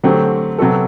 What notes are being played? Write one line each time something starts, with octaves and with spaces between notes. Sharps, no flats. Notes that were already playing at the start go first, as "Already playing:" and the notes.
D3 F#3 A3 C4 G4
C3 F#3 B3 F#4 A4